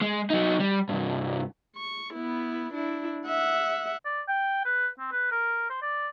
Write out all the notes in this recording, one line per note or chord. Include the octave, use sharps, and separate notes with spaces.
G#3
F#3 D#4
G3
C2 G2
C#6
B3 E4
D4 E4
E5 F#5
D5
G5
B4
C4
B4
A#4
C5
D5